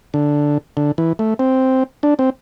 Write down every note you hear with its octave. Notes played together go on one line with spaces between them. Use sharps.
D3
D3
E3
A3
C4
D4
C4